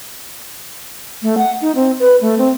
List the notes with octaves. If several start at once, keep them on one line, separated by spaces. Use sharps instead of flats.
A3
F#5
D#4
C4
B4
A3
C4